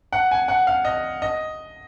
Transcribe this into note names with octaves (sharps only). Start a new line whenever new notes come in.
F#5
G#5
F#5
F5
D#5
D#5